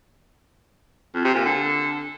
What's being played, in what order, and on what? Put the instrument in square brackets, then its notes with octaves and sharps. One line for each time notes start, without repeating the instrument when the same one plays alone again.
[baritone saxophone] F2
C3
A#2
D3